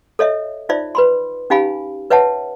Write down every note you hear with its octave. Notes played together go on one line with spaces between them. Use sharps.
A4 C#5 D#5 E5
D#4 F4 C5 D5 E5
B4 B5 C6
C#4 D#4 G4 F5 G#5 B5
B4 C#5 E5 F#5 A5